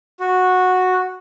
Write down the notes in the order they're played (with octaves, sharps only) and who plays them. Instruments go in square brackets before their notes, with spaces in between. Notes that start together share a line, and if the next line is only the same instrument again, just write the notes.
[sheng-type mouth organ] F#4